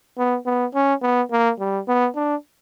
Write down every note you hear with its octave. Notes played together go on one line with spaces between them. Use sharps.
B3
B3
C#4
B3
A#3
G3
B3
D4